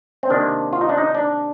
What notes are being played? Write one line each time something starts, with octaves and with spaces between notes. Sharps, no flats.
C4
C3 D#3 A#3 D4
F4
D#4
D4
D#4
D4